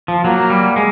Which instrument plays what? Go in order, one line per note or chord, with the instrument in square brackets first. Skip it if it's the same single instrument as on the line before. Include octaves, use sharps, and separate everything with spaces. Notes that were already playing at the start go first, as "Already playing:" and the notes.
[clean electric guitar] F3
[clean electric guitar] F#3 [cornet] A#3
[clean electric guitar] G3
G#3